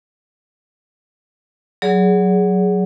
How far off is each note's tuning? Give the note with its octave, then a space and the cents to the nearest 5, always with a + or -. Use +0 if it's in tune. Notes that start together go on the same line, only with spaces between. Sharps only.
F#3 +0 G#4 +0 D5 -45